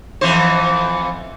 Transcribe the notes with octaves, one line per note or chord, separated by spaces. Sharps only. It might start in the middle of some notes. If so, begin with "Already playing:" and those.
F2 E3 C5